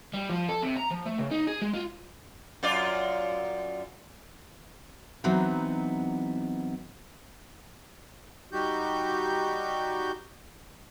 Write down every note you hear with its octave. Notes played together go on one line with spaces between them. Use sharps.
G3
F3
A4
C3
A#5
F3
A3
C#3
D#4
G#4
G#3
F4
F#2 F4 D5
E3 F#3 B3 C4 D#4
G3 D#4 F#4 G4 G6